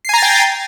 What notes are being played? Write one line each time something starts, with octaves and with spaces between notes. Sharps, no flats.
G5 G#5 A#5 A6 C7